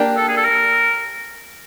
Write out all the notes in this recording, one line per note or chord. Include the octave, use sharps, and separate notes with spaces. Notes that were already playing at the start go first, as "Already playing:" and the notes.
Already playing: A#3 D4 G4
A4
G#4
A4
A#4